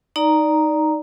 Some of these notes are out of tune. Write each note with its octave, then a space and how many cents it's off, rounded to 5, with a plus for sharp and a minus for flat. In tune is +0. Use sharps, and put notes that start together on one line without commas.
D#4 +0 D5 +0 A#5 +0